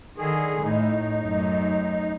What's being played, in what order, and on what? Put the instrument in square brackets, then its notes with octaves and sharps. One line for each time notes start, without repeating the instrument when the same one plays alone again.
[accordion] D3 G#4 [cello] D#3
[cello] A2 [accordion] D#4
[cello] F#2 A3